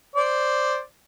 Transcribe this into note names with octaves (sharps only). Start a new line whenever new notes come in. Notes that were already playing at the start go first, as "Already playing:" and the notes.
C5 D5